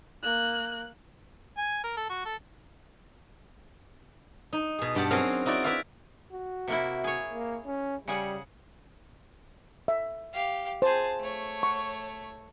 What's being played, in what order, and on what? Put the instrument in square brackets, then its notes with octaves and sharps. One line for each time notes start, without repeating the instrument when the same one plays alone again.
[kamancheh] A#3 F#6
[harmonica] G#5
A#4
A4
F#4
A4
[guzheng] D#4
B2 G#4
G2 G4 F#5 A5
F#3 C4 C#4 G#4 A#4
D#4 E4 F#4 D5
E4 B4 D5 E5 F5
[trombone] F#4
[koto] C3 A#3 E4
G#4 C#5
[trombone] A#3
C#4
[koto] C#3 G#4 F#5 [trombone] G3
[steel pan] E5
[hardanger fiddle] G4 F5
[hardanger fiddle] G#4 A5 [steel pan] C5
[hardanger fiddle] A3 C#5
[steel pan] C#6